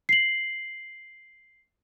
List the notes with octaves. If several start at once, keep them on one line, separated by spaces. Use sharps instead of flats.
C7 F#7